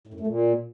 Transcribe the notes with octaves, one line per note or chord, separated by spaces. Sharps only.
A2
F#2
A3
A#2